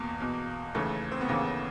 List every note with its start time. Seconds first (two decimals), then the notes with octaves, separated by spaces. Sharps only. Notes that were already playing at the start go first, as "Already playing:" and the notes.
Already playing: E2 B2 A#3
0.20 E2 B2
0.75 D#2 C#3 E3 A3
1.12 C4
1.21 B3
1.28 D#2 C#3 E3 A#3